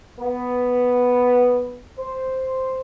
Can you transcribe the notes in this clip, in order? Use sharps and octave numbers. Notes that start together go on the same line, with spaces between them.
B3
C5